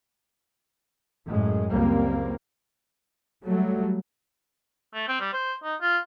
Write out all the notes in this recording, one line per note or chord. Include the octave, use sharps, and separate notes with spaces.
F#2 A2 G#3
C#2 F#2 G3 A#3 C4
F#3 G3 A3
A3
C4
G3
C5
D#4
F4